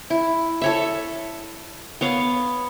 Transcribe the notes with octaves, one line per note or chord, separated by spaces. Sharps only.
E4
A4 C#5 E5
B3 C#5 F5